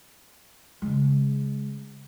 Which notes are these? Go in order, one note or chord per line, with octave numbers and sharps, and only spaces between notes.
C#3 G#3